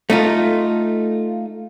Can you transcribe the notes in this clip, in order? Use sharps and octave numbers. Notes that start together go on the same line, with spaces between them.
A3 D#4 F4